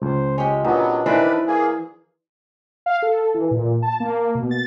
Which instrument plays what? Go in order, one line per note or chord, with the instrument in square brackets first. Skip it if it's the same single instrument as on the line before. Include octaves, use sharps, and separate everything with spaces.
[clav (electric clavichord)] C#2 [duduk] C5
[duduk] G#3 [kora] C#4 G4
[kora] A#2 [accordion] F#3 B3 [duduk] D4 [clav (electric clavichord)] D#4
[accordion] D#3 B4 [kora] E3 C5 D5
[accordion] A#3 G#4
[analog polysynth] F5
A4
E3
A#2
A5
A#3
B2
A6